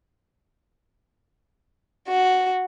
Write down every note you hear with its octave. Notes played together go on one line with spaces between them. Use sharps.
F#4